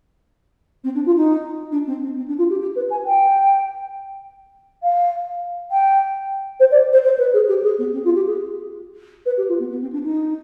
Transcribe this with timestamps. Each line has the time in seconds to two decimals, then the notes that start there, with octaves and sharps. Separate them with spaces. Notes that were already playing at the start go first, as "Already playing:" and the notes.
0.84 C4
0.94 D4
1.05 F4
1.16 D#4
1.71 D4
1.86 C4
2.02 C4
2.16 C4
2.27 D4
2.38 F4
2.50 G4
2.61 G4
2.75 B4
2.90 G#5
3.05 G5
4.83 F5
5.71 G5
6.59 C5
6.71 D5
6.92 C5
7.04 C5
7.18 B4
7.33 G#4
7.48 G4
7.63 G#4
7.78 B3
7.93 C4
8.04 F4
8.15 G4
8.26 G#4
9.25 B4
9.37 G4
9.48 F4
9.59 B3
9.70 B3
9.81 C4
9.92 D4
10.03 D#4